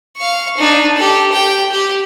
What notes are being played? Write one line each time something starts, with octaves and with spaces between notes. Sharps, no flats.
F5 C#6
D4 D#4
G4 A4
G4 G5
G4